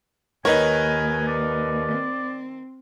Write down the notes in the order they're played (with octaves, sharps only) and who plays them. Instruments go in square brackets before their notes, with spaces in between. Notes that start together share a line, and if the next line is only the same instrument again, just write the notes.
[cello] D#2 [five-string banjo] D#3 C#5 [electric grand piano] A#4 B4 D#5 [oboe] G#5
[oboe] D5
[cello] C4